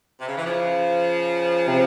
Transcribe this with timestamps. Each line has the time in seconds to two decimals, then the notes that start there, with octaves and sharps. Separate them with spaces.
0.20 C3
0.28 C#3
0.36 E3
0.45 C#3 F3
1.67 C3